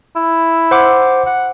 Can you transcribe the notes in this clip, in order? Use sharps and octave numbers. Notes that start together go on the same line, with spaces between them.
E4
C5 F#5 D6
F#5